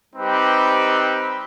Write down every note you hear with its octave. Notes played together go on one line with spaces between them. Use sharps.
G3 C4 D#4 G4 B4